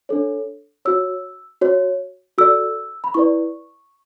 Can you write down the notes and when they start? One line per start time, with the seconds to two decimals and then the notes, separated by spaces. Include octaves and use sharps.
0.09 D4 A4 C#5
0.85 F#4 C#5 E6
1.61 F#4 C#5
2.38 F#4 A4 D5 E6
3.04 B5
3.14 E4 B4 D5 C#6